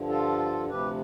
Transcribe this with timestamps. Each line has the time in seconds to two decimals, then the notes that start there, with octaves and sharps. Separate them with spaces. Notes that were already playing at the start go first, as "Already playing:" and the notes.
Already playing: G2 D3 F3
0.09 F4 A4
0.70 D2 C3 F3 G4 B4